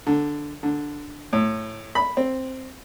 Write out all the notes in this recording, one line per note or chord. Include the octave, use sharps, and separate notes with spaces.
D3
D3
A2
B5
C4